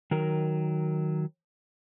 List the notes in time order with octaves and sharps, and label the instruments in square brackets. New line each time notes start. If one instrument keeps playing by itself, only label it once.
[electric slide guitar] D#3 F#3 A#4